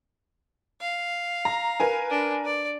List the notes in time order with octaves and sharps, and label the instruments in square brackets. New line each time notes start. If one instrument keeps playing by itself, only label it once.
[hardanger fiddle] F5
[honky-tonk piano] A#5
A#4 B4 G#5
[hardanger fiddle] D4
D5